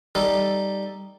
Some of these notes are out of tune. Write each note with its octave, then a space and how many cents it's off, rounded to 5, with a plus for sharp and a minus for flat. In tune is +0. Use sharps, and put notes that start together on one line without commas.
G3 +0 D#4 +0 A4 +0